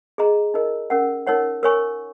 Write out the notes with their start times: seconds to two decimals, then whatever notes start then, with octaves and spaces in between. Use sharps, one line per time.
0.18 G#4 D#5 A#5
0.54 D#4 A#4 D#5
0.90 C#4 A#4 F#5
1.27 D#4 A#4 C#5 F#5
1.63 A#4 C#5 G#5 C#6